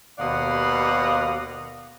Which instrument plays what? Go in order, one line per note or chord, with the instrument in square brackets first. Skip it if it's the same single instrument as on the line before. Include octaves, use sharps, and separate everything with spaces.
[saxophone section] D#2 B2 D5 D#5 F5 F#5